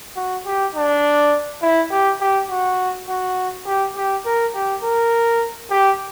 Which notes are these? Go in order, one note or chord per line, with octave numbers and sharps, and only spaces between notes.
F#4
G4
D4
E4
G4
G4
F#4
F#4
G4
G4
A#4
G4
A#4
G4